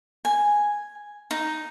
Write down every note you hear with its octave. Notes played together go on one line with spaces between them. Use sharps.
G#5
D#4